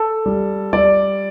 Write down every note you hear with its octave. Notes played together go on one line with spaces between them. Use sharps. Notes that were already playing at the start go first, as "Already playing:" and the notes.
Already playing: A4
G3
G3 D5